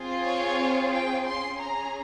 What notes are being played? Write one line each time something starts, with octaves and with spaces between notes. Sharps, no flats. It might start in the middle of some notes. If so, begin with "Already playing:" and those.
Already playing: C4 F4 G#4
C#5
G5
C#4 G#4 C6
A#5